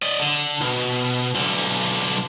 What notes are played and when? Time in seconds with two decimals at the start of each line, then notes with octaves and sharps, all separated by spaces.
0.02 D5 D#5
0.20 D3
0.61 B2
1.35 B1 D3